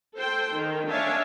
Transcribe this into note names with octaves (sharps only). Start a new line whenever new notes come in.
A4 C5 G5
D#3
D4 C#5 E5 F5 G#5 A5